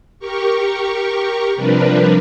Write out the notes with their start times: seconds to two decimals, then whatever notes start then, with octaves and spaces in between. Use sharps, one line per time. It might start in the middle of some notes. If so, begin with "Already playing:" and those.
0.20 G4 A#4 C#6
1.56 C3 F3 G3 D4 A#4 B4